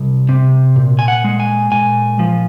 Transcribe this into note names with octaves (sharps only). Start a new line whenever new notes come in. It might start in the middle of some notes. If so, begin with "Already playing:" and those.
Already playing: C2
C3
A#2
G#5
F#5
G#3
G#5
A#2 G#5
F3